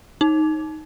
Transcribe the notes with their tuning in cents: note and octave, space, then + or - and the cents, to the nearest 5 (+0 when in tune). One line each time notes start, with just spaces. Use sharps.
D#4 +5